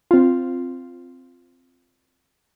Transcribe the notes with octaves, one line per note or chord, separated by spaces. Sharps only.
C4 F4